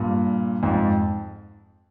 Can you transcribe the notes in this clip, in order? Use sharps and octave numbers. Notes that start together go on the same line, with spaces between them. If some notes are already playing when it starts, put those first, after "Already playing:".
Already playing: G2 A#2
F2 G#2